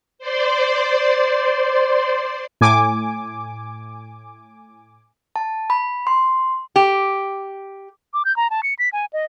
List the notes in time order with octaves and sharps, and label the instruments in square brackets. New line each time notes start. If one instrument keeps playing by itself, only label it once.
[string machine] C5 D5 C6
[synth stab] A2 G#5 D6
[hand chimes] A5
B5
C6
[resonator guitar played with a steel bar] G4
[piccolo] D6
G6
A#5
A5
C#7
B6
G#5
D#5